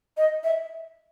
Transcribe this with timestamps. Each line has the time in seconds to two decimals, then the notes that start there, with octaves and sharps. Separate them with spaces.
0.17 D#5
0.43 E5